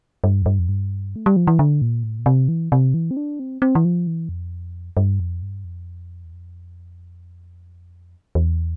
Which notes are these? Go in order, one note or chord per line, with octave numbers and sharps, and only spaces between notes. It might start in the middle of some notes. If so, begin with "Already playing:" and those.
G2
F2
G2
F2
G2
A3
G3
F3
E3
D3
A#2
A2
A#2
C3
E3
C3
E3
C4
D4
C4
C4
E3
F3
E3
F2
G2
F2
G2
F2
E2
F2
E2